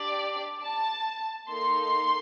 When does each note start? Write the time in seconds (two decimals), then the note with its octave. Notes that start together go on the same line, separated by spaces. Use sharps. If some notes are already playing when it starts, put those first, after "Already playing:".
Already playing: D4 G4 D5
0.64 A5
1.49 A#3 D#4 A4 C6